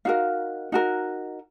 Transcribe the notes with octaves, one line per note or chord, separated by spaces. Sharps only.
D#4 F#4 A#4 F5
D#4 F#4 A#4